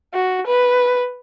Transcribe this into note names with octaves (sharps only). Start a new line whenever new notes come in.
F#4
B4